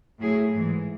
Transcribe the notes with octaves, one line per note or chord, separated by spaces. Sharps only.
A2 F#3 A3 E4 G#4
G#2 E3 G#3